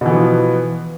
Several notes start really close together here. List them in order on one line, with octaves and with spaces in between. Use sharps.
B2 E3 B3 F3